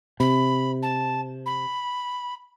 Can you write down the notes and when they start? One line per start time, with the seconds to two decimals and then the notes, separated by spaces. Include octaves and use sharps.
0.20 C3 B5
0.82 A5
1.46 B5